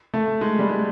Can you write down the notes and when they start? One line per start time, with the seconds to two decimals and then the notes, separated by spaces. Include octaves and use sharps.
0.14 A3
0.41 G#3
0.59 G3
0.69 G#3